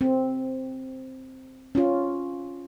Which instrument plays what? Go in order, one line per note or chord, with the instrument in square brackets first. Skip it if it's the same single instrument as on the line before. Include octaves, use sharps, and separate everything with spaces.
[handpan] C4
C#4 F4